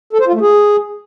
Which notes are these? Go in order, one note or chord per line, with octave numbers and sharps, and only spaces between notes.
A4
C5
F4
A3
G#4